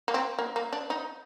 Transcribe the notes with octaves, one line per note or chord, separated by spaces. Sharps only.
A#3
C4
A#3
A#3
D4
D#4